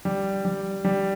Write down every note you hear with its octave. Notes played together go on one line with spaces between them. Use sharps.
G3
G3
G3